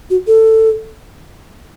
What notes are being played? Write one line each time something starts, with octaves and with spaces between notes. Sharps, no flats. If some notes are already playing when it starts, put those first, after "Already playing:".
F#4
A4